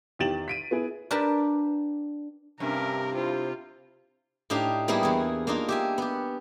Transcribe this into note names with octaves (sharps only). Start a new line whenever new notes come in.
E2 D#3 G4 A6 E7 F#7
B6 D7 D#7
B3 E4 G#4
D4 G4 A#4 B4 A5
G2 C3 C#4 A#4 E5
C4 E4 F4 C5
A2 D4 D#4 G4 F5
G3 A#3 B3 E4 G#4
E2 G#4
A#3 D4 D#4 F4
G4 E5 G#5
B3 G4